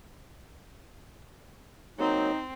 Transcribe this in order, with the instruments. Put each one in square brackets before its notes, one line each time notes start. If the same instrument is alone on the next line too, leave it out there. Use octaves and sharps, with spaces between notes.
[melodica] F#3 A#3 [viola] C4 [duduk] D#4